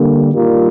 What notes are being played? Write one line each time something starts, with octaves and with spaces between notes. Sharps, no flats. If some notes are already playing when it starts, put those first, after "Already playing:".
Already playing: D3 G3 A#3
G2 D#3 G3 A#3 F4